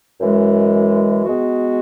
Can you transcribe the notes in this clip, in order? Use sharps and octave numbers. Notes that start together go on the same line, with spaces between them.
F#2 E3 G#3
G#3 B3 F#4